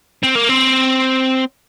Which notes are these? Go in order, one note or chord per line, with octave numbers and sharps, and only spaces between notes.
C4
A#3
C4